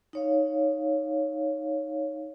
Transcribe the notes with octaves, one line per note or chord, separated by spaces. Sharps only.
D#4 C#5 F5